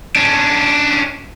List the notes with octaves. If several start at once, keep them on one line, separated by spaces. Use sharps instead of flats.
C#4 D4